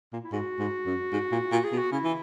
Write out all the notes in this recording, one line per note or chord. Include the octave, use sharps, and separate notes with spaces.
A#2
E4
G#2 F#4
G#2
F#2
G#2
A#2
A#2
G#4
B2
F#4
C#3 E4
E3